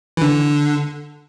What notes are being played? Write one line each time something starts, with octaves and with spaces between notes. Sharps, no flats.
E3
D3